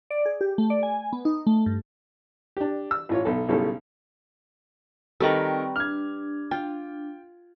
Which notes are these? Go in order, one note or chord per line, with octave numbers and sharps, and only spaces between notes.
D5
G#4
G4
A3
D5
G#5
B3
D#4
A3
G2
D4 G4
E6
A1 F4 C#5
B1 A4
B1 A2 C#3 G3 C#4 A4
D#3 G3 C4 A4 B4 G5 A#5 C#6
D4 F6 G#6
F4 G5